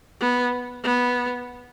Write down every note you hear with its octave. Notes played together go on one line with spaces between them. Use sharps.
B3
B3